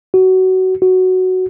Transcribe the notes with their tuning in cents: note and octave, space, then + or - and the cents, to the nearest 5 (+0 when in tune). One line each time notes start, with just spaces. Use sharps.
F#4 +20
F#4 +5